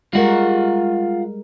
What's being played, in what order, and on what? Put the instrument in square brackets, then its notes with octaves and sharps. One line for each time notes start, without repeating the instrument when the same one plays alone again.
[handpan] G3 G#3 A#4 [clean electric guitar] F4 F#5